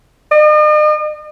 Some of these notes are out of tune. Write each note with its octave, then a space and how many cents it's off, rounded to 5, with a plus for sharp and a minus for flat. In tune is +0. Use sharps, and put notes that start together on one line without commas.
D#5 -45